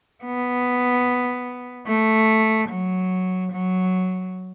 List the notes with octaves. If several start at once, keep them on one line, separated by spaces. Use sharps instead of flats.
B3
A3
F#3
F#3